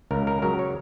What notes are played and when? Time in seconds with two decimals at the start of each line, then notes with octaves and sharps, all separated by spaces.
0.11 C#2 A#4
0.27 A#4
0.42 C#3 F#3 A#4
0.59 C#5